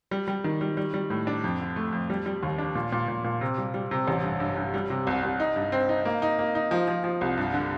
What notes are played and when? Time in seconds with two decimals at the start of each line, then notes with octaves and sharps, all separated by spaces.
0.11 G3
0.28 G3
0.44 D#3
0.61 G3
0.77 G3
0.94 G3
1.10 A2
1.27 D4
1.44 F2
1.60 D3
1.76 A3
1.93 F2
2.10 G3
2.26 G3
2.43 D#2
2.58 D4
2.75 A#2
2.92 A#2
3.08 A#2
3.24 A#2
3.41 C3
3.58 G3
3.74 G3
3.91 C3
4.08 A1
4.23 G2
4.40 G2
4.56 G2
4.74 G3
4.90 C3
5.07 C2
5.23 C2
5.40 D#4
5.56 G2
5.72 C4
5.89 D#4
6.05 A#3
6.22 D#4
6.39 A#3
6.55 D#4
6.71 F3
6.88 F3
7.04 F3
7.21 C2
7.37 G2
7.54 D3